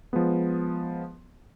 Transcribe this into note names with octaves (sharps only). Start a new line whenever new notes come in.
F3 G#3 B3